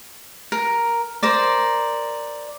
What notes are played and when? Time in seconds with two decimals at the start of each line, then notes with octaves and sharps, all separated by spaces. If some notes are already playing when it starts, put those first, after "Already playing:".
0.52 A#4
1.23 A#4 C5 D5